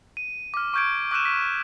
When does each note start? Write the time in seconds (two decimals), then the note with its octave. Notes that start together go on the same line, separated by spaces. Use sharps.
0.17 D#7
0.54 D6 F6
0.74 C#6 F6 G6 G#6 D7
1.11 D6 E6 F#6 G6 D#7 E7
1.25 B6